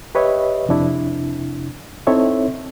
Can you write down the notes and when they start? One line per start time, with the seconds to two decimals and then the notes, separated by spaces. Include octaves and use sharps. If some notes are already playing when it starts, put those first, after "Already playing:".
0.15 G4 B4 C#5 D#5 E5
0.69 F2 C3 D4 E4
2.07 C4 D#4 E4 A4 C#5 E5